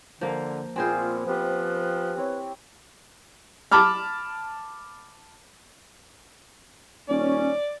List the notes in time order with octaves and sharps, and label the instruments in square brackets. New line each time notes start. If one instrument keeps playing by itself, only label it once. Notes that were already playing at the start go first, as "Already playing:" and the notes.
[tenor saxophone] D3 [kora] F3 A#3
[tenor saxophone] A#2 [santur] B3 G#5 [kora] C4 G#4 C5 [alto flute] F4
[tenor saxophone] F3 [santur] B3 G4 D#5 [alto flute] B4
[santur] C4 E4 C#5
[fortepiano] A5 B5 D6 F6
[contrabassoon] D#1 [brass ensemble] C#4 [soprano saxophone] D5